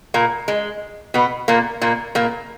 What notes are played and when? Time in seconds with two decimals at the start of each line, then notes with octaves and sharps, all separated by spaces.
0.14 A#2 A#3
0.48 G#3
1.14 B2 B3
1.48 A#2 A#3
1.82 A#2 A#3
2.15 A#2 A#3